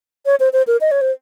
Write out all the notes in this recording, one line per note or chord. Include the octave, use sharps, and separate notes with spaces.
C#5
C5
C5
A#4
D#5
C#5
C5